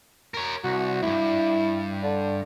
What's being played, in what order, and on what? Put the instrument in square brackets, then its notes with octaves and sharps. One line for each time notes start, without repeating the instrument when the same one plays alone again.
[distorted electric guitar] A#4 C#5
[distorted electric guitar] C2 [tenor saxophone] F#4
[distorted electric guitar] C#2 G2 [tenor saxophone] E4
[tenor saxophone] D3